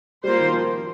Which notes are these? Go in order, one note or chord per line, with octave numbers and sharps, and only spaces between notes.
G3 A#3 F4 C5
D#3
F3